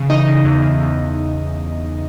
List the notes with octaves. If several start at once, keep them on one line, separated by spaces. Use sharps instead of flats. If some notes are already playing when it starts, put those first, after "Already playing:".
Already playing: C#3
E3 D#4 D#5
C#3
E2
C#3
E2